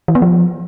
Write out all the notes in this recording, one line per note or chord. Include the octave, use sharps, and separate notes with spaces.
E3
B3
F3